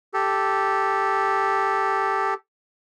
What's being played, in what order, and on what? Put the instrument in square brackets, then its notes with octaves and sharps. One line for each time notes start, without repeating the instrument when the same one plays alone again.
[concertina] G4 A4